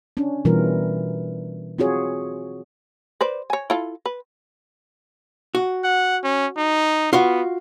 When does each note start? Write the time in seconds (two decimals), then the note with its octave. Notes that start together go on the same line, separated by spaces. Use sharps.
0.17 C#4 D4
0.45 B2 E3 G3 F4 A#4
1.78 C4 F4 F#4 G#4 C#5
3.21 B4 C5 D5
3.50 C#5 G#5
3.70 E4 F4 A4
4.06 B4
5.55 F#4
5.84 F#5
6.23 C#4
6.57 D#4
7.13 B3 F4 F#4 F5